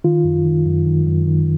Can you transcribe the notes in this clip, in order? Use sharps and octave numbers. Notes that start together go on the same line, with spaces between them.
D#3 F4
F#2
D#3
F#2
D#3
F#2
D#3